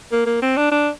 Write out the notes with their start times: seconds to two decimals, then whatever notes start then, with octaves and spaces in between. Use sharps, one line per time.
0.12 A#3
0.26 A#3
0.42 C4
0.57 D4
0.71 D4